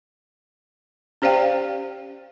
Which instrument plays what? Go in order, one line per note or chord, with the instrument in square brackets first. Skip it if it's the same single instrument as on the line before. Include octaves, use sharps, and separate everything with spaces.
[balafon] C#4 G4 C5 D5 F5 G5